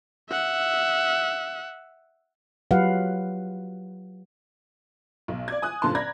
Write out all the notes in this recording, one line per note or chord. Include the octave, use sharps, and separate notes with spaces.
E5 F#5
F#3 F4 G4 B4 F5 F#5
B1
D5 D6 G#6
G#5 D#6 F#6
F#1 A#2 D3 A5 C6
D5 A#5 B5 G#6 A#6